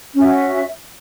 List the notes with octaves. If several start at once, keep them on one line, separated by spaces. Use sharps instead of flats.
C#4 F#4 E5